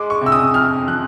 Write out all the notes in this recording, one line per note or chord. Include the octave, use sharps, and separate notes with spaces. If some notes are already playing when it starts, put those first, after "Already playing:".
Already playing: G#3 D6
C#6
C3 E6
D#6
F2 F6
F3 F#6